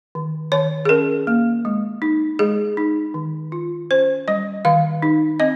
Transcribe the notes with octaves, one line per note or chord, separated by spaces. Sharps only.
D#3
D#3 C#5
G#4
C#4 A#4
A#3
G#3
D#4
G#3 G#4
D#4
D#3
F4
C#4 C5
G3 D#5
D#3 F5
D#4
C4 D#5